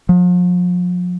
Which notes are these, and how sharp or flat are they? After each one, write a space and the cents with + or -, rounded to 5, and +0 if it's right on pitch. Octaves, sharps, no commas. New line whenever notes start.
F3 +40